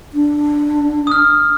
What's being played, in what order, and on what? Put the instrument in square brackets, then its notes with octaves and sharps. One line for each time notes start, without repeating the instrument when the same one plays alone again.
[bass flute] D4
[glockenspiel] D#6 F6